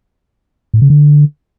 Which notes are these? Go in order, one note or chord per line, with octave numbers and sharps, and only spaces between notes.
A2
C#3
D3